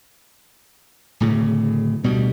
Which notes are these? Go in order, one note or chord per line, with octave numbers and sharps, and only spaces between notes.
D1 A2 C#3
D2 B2 G3